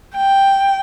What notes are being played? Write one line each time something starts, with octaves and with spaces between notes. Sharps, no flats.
G5